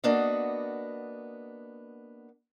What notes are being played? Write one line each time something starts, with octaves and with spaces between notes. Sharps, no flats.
A#3 B3 D4 F#4 D#5